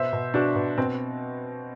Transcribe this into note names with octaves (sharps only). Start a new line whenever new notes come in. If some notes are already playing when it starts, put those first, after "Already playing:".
Already playing: B2 C5 E5
B2
B2 D4 F#4
B2
B2 C4